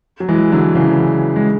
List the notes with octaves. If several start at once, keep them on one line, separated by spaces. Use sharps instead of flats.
F#3
E3 G#3
D3 F#3
C#3 E3
G#3